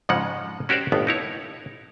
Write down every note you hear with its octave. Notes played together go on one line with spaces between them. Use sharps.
F2 G#2 C#3 F3 G#3 F#5
C#4 F#4 G4 A#4 C5 D5
G1 D#2 A2 B3
D#4 E4 C#5